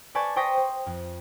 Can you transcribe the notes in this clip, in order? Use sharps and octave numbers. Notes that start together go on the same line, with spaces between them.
B4 D5 G#5 A5 C#6 G6
C5 G5 C#6 D#6 A#6 B6
C5
F2